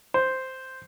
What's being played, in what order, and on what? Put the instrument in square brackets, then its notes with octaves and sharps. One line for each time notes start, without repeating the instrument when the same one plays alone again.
[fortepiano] C5